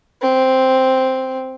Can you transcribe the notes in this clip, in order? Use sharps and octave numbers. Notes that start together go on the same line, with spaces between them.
C4